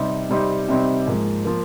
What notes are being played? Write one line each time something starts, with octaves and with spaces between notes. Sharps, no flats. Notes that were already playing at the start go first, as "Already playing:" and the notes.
Already playing: C3 G3 C4 D#4
C3 G3 C4 D#4
C3 G3 C4 D#4
G#2 F3 A#3
F3 A#3